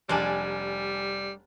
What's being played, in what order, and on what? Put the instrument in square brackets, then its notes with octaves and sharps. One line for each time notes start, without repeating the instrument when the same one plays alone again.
[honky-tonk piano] F1 G#5 [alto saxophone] G3 [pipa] G#3 D4